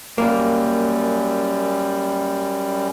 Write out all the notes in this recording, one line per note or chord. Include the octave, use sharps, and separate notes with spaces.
F#2 G3 A#3